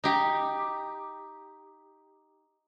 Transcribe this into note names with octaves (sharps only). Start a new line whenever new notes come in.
D#4 G4